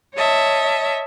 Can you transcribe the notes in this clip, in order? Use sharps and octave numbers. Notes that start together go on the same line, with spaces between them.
C#5 D#5 E5 A5